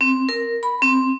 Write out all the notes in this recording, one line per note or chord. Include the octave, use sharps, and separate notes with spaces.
C4
A#4
B5
C4